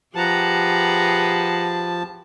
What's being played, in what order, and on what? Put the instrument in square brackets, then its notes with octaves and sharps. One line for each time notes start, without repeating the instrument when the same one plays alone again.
[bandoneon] F3 A5 [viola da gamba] G4 G#4 B4 [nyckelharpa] F#5 A#5